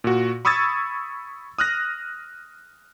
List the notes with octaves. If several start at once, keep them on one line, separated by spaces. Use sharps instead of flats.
A#2 F#4
B5 C#6 D#6 E6 G#6 A6
D#6 F6 F#6 A#6